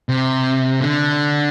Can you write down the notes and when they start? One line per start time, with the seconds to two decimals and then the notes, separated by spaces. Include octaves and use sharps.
0.09 C3
0.81 D3